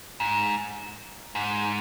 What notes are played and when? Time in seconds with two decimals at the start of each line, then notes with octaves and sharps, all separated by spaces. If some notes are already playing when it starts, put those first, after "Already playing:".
0.20 G#2
1.35 G#2